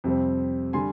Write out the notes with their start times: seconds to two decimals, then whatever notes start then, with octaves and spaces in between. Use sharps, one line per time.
0.04 F2 C3 G3 C4
0.73 D3 G3 G#5 C6